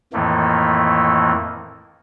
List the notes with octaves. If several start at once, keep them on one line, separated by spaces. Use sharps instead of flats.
F2 A2 D#3 E3 A3 A#3